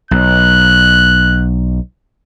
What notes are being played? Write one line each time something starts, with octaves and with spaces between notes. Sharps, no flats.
B1 F#6